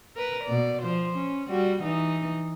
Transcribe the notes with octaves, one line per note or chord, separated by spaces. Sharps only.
A#4 B4
B2 D5
F3 C5
C#4
G3 F#4
E3 D#4